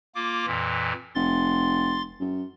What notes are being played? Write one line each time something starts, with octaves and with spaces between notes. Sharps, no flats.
A#3 F4 D6
F2 A#2 E3
F1 C6 A6
F#2